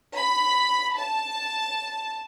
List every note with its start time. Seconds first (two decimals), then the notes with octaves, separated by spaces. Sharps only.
0.16 B5
0.97 A5